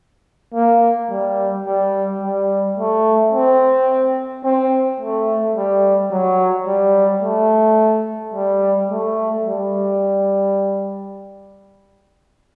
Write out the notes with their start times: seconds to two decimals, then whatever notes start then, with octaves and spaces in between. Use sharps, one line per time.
0.54 A#3
1.10 G3
1.66 G3
2.22 G3
2.78 A3
3.32 C4
4.44 C4
5.00 A3
5.56 G3
6.11 F#3
6.67 G3
7.22 A3
8.34 G3
8.90 A3
9.45 G3